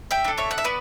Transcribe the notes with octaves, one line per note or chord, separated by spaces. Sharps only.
E5 G5
D4 A4
C#5 E5
F#5
E5
B3 B4 D5